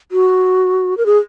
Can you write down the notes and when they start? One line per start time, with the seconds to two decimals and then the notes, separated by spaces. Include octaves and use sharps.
0.12 F#4
0.97 A#4
1.06 G#4